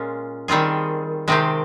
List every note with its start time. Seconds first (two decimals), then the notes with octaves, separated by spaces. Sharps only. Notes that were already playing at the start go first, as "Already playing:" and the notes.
Already playing: A#2 G#3 C#4 F4
0.48 D#3 G3 C4 F4 G#4
1.28 C3 D#3 G#3 C4 G4